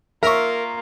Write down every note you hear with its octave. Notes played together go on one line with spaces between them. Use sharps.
A#3 F4 A#4 E5 C#6